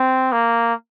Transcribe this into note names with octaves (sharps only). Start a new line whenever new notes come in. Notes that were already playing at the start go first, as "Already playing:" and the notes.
Already playing: C4
A#3